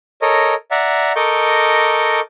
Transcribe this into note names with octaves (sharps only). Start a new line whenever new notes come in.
A4 A#4 C#5 D#5
D5 E5 F#5 A#5
A4 A#4 D#5 C#6 D6 G6